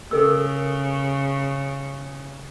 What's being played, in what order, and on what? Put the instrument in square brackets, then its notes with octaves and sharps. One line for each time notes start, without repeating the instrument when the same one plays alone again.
[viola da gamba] C#3 [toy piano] A4 A#4 E6